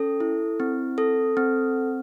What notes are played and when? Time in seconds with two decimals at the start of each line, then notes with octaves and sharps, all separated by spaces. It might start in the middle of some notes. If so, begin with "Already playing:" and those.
Already playing: C#4 A4
0.20 E4
0.60 C4
0.98 A4
1.37 C4